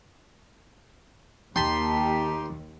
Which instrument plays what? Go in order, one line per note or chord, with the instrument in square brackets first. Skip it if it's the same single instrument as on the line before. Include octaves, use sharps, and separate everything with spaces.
[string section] D#2 [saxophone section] D#4 G4 [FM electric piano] G5 A5 B6 [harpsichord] C6